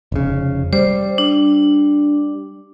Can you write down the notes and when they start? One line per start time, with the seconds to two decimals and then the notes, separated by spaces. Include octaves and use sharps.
0.12 F1 C#3
0.73 G3 C5
1.18 D4